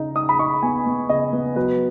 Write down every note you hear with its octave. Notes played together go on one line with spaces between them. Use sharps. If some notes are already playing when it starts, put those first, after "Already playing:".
Already playing: C#3 D#4
D#4 D#6
B5
D#4 C#6
B3 G#5
B3
C#3 D#5
B3
F#3 B4